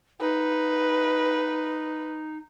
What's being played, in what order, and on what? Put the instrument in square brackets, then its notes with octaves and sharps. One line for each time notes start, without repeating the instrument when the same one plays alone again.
[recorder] D#4 [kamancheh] B4